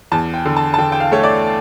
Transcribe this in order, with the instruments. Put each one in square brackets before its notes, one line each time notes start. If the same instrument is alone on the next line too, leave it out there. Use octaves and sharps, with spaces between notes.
[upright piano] E2 A5
G5
D3
A5
A5
D3 G5
G5
F5
A3 C#5
D5